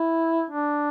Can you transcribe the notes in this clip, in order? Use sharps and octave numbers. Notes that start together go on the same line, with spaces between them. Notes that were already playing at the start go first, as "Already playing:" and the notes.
Already playing: E4
D4